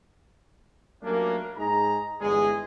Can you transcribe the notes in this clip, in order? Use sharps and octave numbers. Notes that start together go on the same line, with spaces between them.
F#3 G3 A3 A#3 C#4 D4
G#2 D#4 G#4 A#5
G1 E2 E3 G#3 G#4